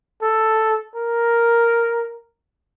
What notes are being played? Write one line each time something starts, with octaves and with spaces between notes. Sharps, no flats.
A4
A#4